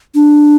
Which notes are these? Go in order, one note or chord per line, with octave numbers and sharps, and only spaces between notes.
D4